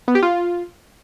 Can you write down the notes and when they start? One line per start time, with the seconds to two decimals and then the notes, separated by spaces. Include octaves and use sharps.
0.08 B3
0.15 G4
0.22 F4